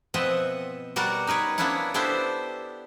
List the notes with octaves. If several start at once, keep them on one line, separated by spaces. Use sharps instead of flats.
B2 F3 C4 D#5 E5 F#5
B2 G3 F#4 A#4 D5 F#5
D#4 A#4 B4 C#5
A#3 B3 C#4 D4 E4 F#5
B3 D4 E4 G4 A4 C5